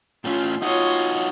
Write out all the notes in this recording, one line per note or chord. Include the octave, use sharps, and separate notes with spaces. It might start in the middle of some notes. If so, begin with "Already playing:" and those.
A2 C#4 F4
D#4 F4 F#4 C#5 D#5